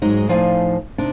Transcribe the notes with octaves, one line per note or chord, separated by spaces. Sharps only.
G#2 F#3 G#3 D#4 G#4
A2 F3 D#4 D5 F5 G#5
C3 D4 D#4